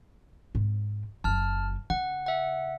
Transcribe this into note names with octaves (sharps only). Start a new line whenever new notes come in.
G#2 C4
F#1 F#3 A5 F6
C#3 F#5
E5 F#5